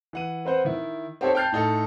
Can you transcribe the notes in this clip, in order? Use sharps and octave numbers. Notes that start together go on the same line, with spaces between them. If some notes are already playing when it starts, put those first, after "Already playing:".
E3 F#5 D#7
C4 B4 C5 F#5
D#3 E4
C4 D#4 G4 A4 C5 C#5
G5 A5 F6 G6 A6 C7
A2 D#4 A4